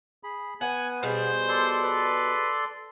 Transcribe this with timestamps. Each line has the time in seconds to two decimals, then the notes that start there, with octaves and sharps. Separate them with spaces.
0.23 G#4 B5
0.61 B3 F#5 G#5
1.03 B2 G3 G#4 C5
1.49 A4 D5 C6
1.85 B4